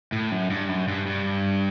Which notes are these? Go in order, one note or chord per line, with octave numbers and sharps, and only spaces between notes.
A2
F#2
G2
F#2
G2
G2